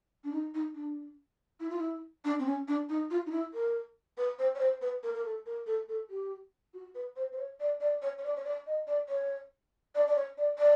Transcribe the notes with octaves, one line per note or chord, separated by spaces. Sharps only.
D4
D#4
D#4
D4
E4
F4
E4
D4
C4
C#4
D4
D#4
F4
D#4
E4
A#4
B4
C5
C#5
C5
B4
A#4
A#4
A4
A#4
A4
A4
G4
F#4
B4
C5
C5
C#5
D5
D5
C#5
C#5
D5
C#5
D5
D#5
D5
C#5
D5
D5
C#5
D5
D5